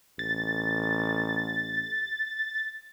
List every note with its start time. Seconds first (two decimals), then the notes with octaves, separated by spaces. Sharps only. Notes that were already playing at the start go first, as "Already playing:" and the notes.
0.19 A1 A6